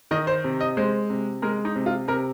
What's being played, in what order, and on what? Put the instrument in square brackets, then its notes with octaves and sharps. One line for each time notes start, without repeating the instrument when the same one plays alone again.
[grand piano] D#3 D#5
C5
C3
D#5
G#3 C5
C3
G#3 A#4
D#4
C3
F4
C3 A#4